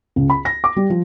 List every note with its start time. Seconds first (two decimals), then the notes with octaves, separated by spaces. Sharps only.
0.16 C#2
0.30 B5
0.45 A#6
0.64 D6
0.76 G3
0.90 F3